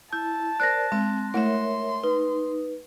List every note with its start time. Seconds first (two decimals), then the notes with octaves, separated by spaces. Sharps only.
0.13 E4 A5 G6
0.60 A#4 C5 D5 F#6 A#6
0.92 G#3 C4
1.34 A3 E4 A#4 C#5 E5 C6
2.04 D#4 B4